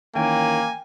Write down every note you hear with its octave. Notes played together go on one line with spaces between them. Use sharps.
D#3 E3 A#3 C#4 G5 G#5